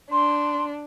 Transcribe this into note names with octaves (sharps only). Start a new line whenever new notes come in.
D4 C6